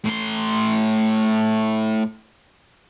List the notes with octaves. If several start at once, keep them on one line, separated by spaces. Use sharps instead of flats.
A2 C6